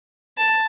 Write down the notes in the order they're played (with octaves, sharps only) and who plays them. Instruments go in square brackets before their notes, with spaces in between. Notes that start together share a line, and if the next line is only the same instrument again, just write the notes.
[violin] A5